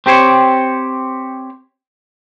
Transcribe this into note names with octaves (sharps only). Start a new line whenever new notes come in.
C4 G4 C5 C#5